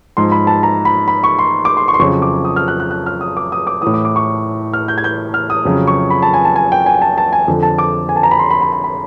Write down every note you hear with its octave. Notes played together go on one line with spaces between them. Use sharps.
G#2 F3 C6
B5
A5
A#5
B5
B5
C#6
C6
D6
C6
C#6
C6
F2 C#3 F#3 C#6
D6
D#6
F6
F#6
F#6
F#6
F6
D#6
D6
D#6
D6
A2 E3 D#6
D6
D6
C#6
F6
G6
G#6
G6
F6
D#6
F2 C#3 F#3
C#6
B5
A5
G#5
A5
G#5
G5
G#5
A5
A5
G#5
F2 D3 F3
A5
D6
G#5
A5
A#5
B5
C6
B5
B5
B5
B5